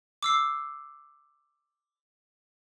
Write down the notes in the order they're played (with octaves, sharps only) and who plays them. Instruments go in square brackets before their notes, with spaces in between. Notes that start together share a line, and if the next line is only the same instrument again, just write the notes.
[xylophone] D6 E6 C7